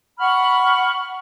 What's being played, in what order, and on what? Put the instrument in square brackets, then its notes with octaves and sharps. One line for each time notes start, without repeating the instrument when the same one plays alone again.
[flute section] F#5 B5 C#6 F6